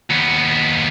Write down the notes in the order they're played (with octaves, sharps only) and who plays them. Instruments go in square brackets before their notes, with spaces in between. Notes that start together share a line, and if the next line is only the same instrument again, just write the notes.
[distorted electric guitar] D#2 B3